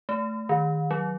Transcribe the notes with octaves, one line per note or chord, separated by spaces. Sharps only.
A3
D#3
F#3